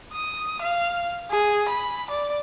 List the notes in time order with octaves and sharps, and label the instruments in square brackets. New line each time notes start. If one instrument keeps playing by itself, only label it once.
[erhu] D#6
F5
G#4
B5
D5